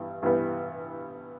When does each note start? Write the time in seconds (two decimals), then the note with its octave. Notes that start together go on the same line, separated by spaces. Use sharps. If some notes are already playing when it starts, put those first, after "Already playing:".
Already playing: G2 E3 G3 B3
0.22 G2 E3 G3 B3